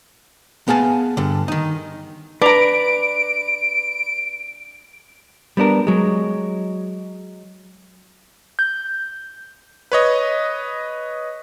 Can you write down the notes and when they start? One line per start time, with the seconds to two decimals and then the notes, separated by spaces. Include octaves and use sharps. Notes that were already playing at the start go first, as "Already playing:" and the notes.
0.68 B3 G#4 F5 A5
1.17 G2 D3
1.48 D#3 D#4
2.42 D4 B4 A#5 D7
5.57 G3 B3 D4 A#4
5.87 F#3 G#3
8.59 G6
9.92 B4 C#5 D#5